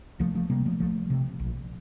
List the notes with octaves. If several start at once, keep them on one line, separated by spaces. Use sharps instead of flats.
C2 F3 A3
F3 A3
C3 G3 A#3
F3 A3
C2 F3 A3
C3
A#1